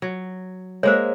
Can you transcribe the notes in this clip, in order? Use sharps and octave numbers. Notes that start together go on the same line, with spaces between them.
F#3
G#3 A#3 C5 C#5 E5